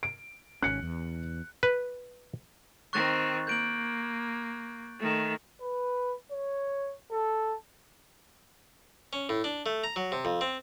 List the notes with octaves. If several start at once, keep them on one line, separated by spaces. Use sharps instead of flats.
D7
G#1 C#4 F#6 C#7
E2
B4
D#3 C4 C#6 F#6 A6
A#3 G6 D7 F#7
D#3 A3
B4
C#5
A4
C#4
A2
D4
A3
A#5
F#3
C3
F2
C4